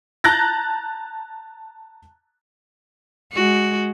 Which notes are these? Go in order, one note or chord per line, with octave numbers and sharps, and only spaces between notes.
A5 A#5 F#6 G6 A6 A#6
G#3 F#4